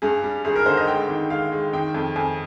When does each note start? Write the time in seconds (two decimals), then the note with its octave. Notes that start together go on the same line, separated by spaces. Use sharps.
0.02 G2 G#4
0.24 G3
0.45 G#1 G#4
0.56 A#4
0.66 D3 C5
0.77 D#5
0.87 G#3 G5
1.09 D#3
1.30 G#3 F5
1.52 G#3
1.73 D#3 G5
1.94 F2
2.16 F2 G#5